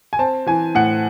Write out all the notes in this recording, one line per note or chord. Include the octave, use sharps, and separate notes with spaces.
G#5
C4 A5
E3 G#5
A2 F#5